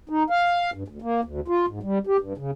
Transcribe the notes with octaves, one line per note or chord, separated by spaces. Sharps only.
D#4
F5
G2
D2
A#3
D2
F4
G#2
G3
G4
G2
C#3